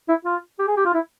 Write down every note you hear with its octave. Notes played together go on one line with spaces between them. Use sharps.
E4
F4
G4
G#4
G4
F4
E4